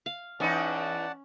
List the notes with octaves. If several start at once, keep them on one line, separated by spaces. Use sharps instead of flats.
F5
E2 C#4 D#4 B4 D5 F#5 A5